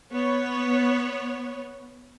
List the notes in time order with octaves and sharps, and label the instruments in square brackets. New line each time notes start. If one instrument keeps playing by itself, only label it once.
[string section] B3 C#5